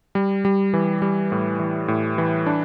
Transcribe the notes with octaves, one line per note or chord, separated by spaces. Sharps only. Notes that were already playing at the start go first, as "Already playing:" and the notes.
G3
G3
E3
G3
A2
E3
A2
E3
D4